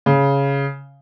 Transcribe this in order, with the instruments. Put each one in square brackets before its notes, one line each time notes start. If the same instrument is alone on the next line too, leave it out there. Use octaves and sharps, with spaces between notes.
[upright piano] C#3